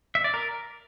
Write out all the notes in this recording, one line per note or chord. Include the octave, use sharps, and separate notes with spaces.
E5
D5
A#4